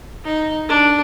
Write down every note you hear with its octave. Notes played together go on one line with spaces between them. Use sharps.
D#4
D4